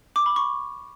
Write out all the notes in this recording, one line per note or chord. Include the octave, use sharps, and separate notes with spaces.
D6
B5
C#6